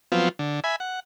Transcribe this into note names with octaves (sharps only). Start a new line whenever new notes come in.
F3 F#3 B3 C4 F4
D3
E5 G#5 B5
F#5